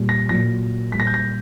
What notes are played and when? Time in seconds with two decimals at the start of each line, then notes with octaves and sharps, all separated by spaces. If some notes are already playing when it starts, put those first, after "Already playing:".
Already playing: A#2 G3
0.09 A#6
0.29 A#2 F#3 A#6
0.92 A#2 G3 B6
1.00 A#6
1.07 G6
1.14 A#6